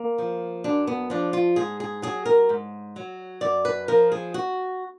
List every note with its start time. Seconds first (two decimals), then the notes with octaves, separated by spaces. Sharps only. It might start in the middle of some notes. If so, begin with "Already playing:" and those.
Already playing: A#3
0.18 F3
0.64 F#2 D4
0.87 B3
1.10 F3 D4
1.33 F4
1.56 G#2 G#4
1.80 G#4
2.02 F#3 G#4
2.26 A#4
2.49 G#2
2.96 F#3
3.41 F#2 D5
3.65 B4
3.88 F3 A#4
4.12 G#4
4.34 F#4